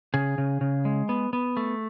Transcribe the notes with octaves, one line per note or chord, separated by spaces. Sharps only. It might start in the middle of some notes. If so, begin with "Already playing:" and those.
C#3 G#4
C#3
C#3
G#3
B3
B3
A3